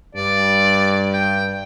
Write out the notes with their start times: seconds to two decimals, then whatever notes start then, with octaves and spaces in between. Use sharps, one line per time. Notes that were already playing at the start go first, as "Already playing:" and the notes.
0.15 G2 D5
1.13 G5